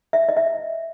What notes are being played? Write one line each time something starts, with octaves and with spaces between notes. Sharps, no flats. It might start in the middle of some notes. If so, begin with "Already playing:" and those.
E5
D#5
E5